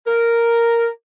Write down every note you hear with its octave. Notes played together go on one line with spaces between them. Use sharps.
A#4